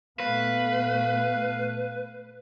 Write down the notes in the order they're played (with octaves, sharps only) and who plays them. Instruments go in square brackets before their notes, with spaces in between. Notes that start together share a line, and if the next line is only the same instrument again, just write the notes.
[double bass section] A#2 A3 B3 [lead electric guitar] B4 [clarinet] F5